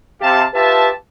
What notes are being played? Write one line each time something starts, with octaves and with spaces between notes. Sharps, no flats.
C3 G4 F5 A5
F4 G4 B4 E5 A5